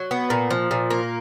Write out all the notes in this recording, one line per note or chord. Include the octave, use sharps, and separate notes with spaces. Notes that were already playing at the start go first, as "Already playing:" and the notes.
Already playing: F#3
B3
A#2
F3
A#2
A#3